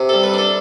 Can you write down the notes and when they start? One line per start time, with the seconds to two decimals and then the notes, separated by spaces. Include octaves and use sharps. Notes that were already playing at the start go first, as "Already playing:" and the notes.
Already playing: C3
0.09 G3 A4
0.23 B4
0.34 D4 A4